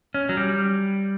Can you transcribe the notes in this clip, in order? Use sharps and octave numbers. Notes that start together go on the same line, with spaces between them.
C#4
F#3
G3